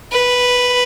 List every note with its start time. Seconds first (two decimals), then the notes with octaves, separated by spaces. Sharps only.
0.12 B4